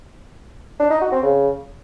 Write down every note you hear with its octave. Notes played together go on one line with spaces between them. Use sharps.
D4
D#4
F#4
C4
C#3